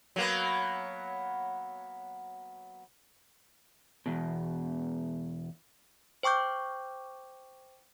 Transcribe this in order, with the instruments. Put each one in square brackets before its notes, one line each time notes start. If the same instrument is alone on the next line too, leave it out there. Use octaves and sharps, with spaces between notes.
[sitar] F#3 A#3 B3
[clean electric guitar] E2 B2
[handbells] C5 G5 C#6 D6 G6